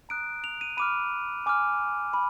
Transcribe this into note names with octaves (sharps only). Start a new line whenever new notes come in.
A#5 D#6 F#6 D7
F7
D#7
B5 D6 F6 D#7
G#5 D6 F6
B5